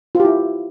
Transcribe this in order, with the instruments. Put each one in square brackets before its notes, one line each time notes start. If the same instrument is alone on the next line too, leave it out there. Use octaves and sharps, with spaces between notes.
[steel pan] F4
G4
E4